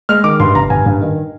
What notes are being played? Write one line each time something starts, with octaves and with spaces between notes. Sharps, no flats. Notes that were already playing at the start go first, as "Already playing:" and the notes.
G#3 F6
D#3 D6
G2 C6
G1 A#5
G2 G#5
G2
D#3